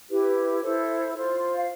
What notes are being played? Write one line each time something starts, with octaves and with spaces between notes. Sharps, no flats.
E4 G4 B4
E4 A4 C5
F4 C5
F5